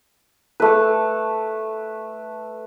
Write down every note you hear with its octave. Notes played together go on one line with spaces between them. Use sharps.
A3 B4